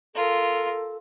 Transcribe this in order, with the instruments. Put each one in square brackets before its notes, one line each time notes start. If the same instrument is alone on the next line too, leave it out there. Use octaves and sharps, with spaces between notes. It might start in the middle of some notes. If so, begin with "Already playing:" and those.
[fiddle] F4 A#4 [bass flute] A4